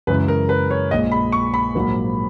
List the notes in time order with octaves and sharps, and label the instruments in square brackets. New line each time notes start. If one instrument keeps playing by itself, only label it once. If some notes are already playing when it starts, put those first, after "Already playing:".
[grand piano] F#2 C#3 E3 G#3 B4
A#4
B4
C#5
A#1 A#2 G#3 D#5
B5
C#6
B5
A#1 G#2 F#3 A#3